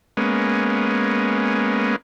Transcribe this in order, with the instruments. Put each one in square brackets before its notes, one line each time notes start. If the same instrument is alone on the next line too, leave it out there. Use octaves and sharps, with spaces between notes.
[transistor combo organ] G#3 A#3 B3 C#4